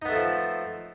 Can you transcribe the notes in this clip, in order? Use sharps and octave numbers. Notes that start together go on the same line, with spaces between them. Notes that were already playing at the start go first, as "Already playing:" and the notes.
F3 A3 B3 D#4 A4